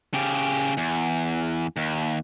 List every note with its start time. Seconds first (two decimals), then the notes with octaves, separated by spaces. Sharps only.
0.14 C#3 G4
0.77 E2
1.77 D#2